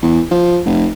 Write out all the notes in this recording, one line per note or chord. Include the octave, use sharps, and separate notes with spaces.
E2
F3
F1